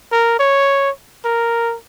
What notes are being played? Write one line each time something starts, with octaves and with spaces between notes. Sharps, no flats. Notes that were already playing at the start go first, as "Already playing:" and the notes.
A#4
C#5
A#4